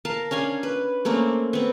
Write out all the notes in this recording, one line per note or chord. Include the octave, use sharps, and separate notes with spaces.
A#4 F5 A5
C#4 D4 F5 G#5
B4
A3 A#3 C4 C#4
B3 C4